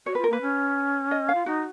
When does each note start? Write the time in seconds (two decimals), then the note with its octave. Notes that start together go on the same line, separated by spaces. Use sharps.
0.06 F#4 C#5
0.15 B4
0.18 F4
0.24 A#4
0.30 A#3 B4
0.42 C#4
1.11 D#5
1.29 F5
1.35 F4
1.46 D#4 F#4